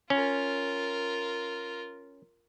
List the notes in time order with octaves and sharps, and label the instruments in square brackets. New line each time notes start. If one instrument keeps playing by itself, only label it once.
[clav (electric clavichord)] C#4 [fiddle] F4 A#4